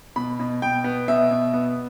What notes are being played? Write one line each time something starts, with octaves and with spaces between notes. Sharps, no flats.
B2 B5
B2
B2 G5
B3
B2 E5
B2
B3